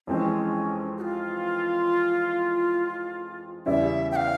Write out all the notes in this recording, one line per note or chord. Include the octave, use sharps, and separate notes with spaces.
F2 E3 G#3 C4 C#4
G4
F4
E2 C#3 G3 C#4 E4 E5
G5
F5